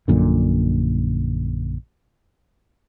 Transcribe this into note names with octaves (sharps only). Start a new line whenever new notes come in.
A#1 F#2 A#2 D3